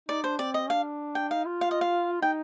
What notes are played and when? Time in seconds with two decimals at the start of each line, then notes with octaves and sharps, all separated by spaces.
0.08 D#4 D5
0.24 D4 C5
0.39 C4 D5
0.54 D#5
0.69 D4 F5
1.15 G5
1.30 D#4 F5
1.46 F4
1.61 F5
1.71 D#5
1.81 F5
2.22 D#4 G5